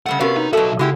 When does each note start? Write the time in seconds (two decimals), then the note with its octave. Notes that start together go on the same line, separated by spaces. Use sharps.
0.06 C#3 G3 A3 F#5
0.20 C3 B3 C#4 F#4 G4 A#4 F5
0.37 D#4
0.53 B1 B2 F#4 A4 E5 F5 A5
0.79 C#3 G#3 E4 F#4 G4 F#5